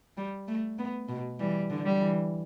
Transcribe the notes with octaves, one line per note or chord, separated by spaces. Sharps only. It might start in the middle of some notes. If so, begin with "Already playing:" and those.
G3
A3
B3
B2
E3 G3
D3
G3
E3